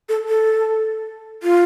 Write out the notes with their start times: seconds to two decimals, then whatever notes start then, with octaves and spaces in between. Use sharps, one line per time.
0.09 A4
0.29 A4
1.43 F4